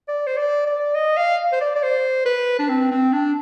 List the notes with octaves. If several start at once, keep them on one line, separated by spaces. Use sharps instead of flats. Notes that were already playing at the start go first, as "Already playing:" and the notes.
D5
C5
D5
D5
D#5
F5
C5
D5
D5
C5
B4
D4
C4
C4
D4